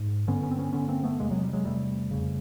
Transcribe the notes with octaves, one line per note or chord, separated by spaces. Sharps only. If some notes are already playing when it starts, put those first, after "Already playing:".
Already playing: G#2
G2 D3 B3 C#4
B3 C#4
C4
B3 C#4
G2 D3 B3 C#4
A#3 C4
A3 B3
E2 C3 G#3 A#3
F#3 G#3
G3
F#3 G#3
E2 C3 G3 A3
F2 C#3